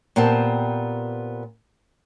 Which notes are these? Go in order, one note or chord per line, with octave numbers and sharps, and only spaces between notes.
A#2 B3 C4 G4 A5